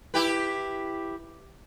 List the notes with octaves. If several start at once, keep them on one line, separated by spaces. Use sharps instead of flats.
E4 G4 B4